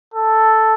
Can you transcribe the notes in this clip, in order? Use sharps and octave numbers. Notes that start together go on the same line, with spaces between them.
A4